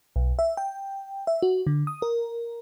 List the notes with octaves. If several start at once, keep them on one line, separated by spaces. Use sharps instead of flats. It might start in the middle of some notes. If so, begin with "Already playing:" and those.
B1
E5
G5
E5
F#4
D3
D#6
A#4